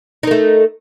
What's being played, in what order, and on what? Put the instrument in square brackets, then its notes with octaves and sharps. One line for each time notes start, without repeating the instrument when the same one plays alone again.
[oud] D#4
A#4
A3